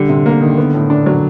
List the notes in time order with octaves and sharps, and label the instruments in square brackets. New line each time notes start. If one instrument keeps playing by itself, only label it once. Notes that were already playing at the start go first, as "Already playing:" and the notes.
Already playing: [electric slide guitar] D3 [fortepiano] G3
[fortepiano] C3
A#3
D#3
B3
A2
D4
F#3